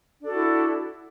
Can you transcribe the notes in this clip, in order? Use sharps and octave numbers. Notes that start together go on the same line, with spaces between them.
D4 E4 F#4 A4